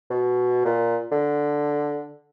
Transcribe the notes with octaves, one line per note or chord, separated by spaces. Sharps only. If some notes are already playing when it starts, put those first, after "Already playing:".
B2
A#2
D3